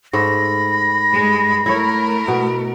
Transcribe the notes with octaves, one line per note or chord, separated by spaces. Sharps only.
G#2 A3 B5 A#6
G2 G#3
A3 E4 A4 A#4 C#5
B2